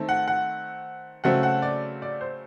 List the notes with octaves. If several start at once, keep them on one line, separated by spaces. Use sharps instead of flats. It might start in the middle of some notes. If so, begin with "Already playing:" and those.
Already playing: D#3 A3 C4
F#5
F#5
C#3 F#3 A3 C4 F#5
F#5
D5
D5
C5